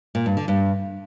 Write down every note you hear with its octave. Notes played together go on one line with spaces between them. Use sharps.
A#2
G2
D3
G2